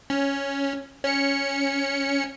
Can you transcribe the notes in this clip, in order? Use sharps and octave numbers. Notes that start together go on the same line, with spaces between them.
C#4
C#4 C#7